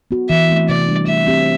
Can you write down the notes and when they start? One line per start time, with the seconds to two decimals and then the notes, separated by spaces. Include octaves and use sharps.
0.11 B3 F#4
0.30 E3 E5
0.49 A3 C4
0.69 C3 D5
0.88 G3 D4
1.07 A3 E5
1.27 C4 G4